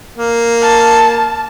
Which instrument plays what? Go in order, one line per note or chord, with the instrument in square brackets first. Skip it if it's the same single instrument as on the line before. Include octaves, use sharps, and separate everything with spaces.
[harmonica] A#3
[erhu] A5